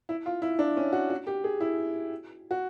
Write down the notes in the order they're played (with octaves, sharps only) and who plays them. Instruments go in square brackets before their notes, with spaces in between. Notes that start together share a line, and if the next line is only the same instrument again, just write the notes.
[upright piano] E4
F4
E4
D4
C#4
F#4
F#4
G4
G#4
E4
F#4